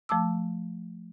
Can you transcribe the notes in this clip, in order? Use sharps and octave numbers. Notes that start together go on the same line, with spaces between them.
F3 A3 A5 D6 E6